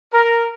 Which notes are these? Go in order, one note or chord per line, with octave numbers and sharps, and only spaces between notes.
A#4